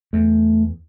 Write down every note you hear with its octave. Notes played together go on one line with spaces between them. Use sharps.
E2 A3